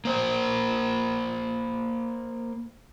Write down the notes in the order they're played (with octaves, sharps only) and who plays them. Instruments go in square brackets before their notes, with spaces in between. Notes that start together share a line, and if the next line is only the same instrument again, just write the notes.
[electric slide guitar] A#3 C5